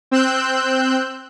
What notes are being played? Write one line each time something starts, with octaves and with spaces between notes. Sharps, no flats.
C4 E6 F#6 G6